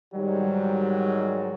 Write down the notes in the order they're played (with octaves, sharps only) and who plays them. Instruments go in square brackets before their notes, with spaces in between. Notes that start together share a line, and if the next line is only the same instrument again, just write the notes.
[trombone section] G#2 D#3 F#3 [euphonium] G3